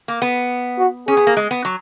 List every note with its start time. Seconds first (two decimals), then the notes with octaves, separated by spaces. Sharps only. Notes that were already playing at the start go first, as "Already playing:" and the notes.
0.08 A#3
0.22 B3
0.79 F#4
1.08 C#4 G#4
1.17 B3
1.27 A#3
1.37 G#3
1.51 B3
1.65 F#3